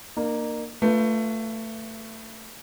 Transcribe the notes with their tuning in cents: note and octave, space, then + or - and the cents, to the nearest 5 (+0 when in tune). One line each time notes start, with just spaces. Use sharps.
A#3 +0 D#4 -45
A3 +20 F4 +0 B4 +0